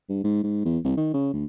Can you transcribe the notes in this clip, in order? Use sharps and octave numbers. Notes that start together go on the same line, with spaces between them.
G2
G#2
G#2
E2
C2
D#3
C#3
D2